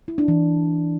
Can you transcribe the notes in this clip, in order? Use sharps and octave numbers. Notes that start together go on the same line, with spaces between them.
E4
D4
E3